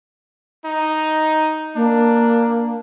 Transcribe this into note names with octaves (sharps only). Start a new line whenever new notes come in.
D#4
A#3 D4